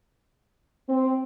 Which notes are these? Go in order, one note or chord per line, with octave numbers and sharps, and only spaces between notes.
C4